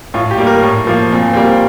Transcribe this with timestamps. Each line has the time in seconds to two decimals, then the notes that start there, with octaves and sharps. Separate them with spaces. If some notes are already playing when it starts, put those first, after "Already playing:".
0.14 A2 F4
0.31 G4
0.38 G3 A#3
0.47 A#4
0.63 A2
0.87 F3 A#3
1.12 A#2 C4
1.33 C4
1.36 G3 A#3